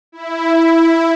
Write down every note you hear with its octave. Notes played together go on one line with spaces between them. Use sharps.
E4